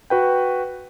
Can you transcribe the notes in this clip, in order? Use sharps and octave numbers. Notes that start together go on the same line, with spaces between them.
F#4 B4 G5